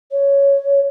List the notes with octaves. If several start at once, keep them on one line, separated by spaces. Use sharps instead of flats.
C#5